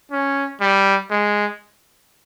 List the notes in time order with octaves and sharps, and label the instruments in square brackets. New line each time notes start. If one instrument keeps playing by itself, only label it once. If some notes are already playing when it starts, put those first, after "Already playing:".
[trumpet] C#4
G3
G#3